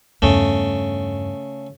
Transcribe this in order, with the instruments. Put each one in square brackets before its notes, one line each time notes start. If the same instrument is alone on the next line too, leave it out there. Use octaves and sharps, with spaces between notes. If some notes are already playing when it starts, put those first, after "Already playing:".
[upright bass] E2 G2 [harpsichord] C#3 A3